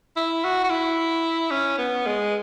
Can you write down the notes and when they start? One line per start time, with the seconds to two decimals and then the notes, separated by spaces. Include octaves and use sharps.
0.17 E4
0.44 F#4
0.64 F#4
0.70 E4
1.51 C#4
1.78 B3
2.06 G#3